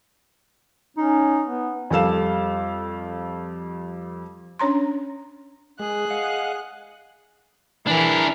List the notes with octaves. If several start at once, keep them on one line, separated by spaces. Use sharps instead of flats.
C#4 D#4
B3
F2 G3 A4 F5 E7
C#4 D4 C#5 A#5 C6
G#3 G#4 F#6
D#5 F5 F#5
E3 D4 A#4